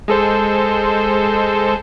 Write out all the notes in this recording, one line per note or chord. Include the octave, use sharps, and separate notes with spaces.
G#3 A4 C5